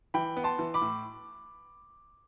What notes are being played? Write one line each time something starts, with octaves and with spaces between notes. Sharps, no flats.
E3 G5 B5
B3
A5 C6
E3
B5 D6
A2